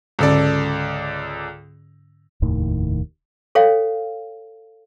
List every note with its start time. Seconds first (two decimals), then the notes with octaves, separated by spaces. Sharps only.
0.19 C#2 G#2 D3 C#4 A4 D5
2.42 F1 D#2 A2 D#3
3.55 A4 C#5 F5 G5